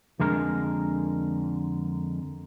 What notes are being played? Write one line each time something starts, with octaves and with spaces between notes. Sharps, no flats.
F2 D3 G#3 A#4